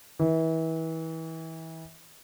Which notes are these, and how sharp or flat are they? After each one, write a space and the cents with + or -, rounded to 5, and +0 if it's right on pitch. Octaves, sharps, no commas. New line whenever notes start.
E3 -30